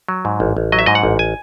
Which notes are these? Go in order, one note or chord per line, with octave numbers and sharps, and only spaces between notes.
F#3
G#2
A1
A1
F#3 D#5
E5
G#2 D#5
F#5
A1
G#5